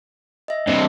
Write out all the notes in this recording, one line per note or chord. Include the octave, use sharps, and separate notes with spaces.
D#5 E5
G2 C3 D5 D#5